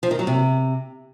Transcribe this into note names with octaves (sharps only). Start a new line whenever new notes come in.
F3
D#3
F#3
C3